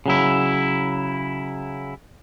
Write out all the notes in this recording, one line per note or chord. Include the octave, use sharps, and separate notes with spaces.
C#3 F#3 E4